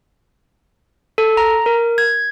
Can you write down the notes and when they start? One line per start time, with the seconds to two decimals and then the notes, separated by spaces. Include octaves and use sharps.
1.18 A4
1.37 A#5
1.66 A#4
1.98 G#6